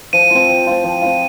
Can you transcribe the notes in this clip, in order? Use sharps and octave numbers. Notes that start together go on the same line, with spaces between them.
F3 D#7
C4 F4
F3
C4 F4
F3
C4 F4